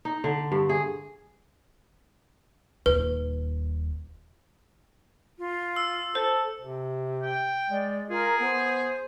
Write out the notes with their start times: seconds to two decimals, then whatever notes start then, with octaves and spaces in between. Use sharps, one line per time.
0.05 D#4
0.24 D3
0.52 G2
0.69 G#4
2.86 D#1 D#2 B4
5.39 F4
5.76 E6
6.15 A4 C5
6.61 C3
7.22 G5
7.70 G#3 D5
8.10 F4 G#4 A#4
8.40 B3 C5